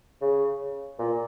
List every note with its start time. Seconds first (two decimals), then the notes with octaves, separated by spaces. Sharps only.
0.21 C#3
0.99 A#2